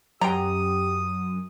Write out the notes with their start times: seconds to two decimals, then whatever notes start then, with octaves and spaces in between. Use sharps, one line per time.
0.21 F#2 G4 G5 A#5 D#6